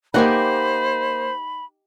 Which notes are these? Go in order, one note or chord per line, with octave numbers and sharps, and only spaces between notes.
A#3 D#4 G4 C5 D#5 F#5 G#5 B5